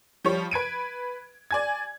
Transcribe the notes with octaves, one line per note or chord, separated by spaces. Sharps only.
F3 G3 C#5
B4 G#6 D7 D#7
D5 G#5 G#6